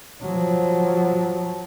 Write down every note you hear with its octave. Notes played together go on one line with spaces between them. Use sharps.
F3 F#3